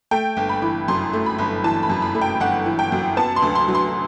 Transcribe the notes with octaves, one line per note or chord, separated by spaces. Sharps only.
A3 G5
G1
B5
E3
F#2 C6
A3
B5
G1
E3 A5
B5
F#2
B5
A3
G5
G1 F#5
E3
G5
F#2
B3 A5
C6
D2
C6
F#3
C6